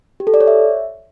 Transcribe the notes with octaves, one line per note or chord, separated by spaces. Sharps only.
G4
A4
D5
C#5
E5